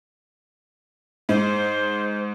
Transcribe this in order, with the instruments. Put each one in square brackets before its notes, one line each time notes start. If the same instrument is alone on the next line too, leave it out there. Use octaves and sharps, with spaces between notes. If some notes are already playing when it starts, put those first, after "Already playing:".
[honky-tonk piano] G#2 [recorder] C5